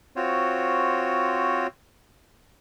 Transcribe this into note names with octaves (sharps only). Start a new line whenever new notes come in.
C4 F4 F#4 C5 C#5